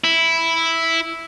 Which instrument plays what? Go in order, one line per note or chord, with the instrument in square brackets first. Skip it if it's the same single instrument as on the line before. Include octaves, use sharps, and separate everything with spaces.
[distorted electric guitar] E4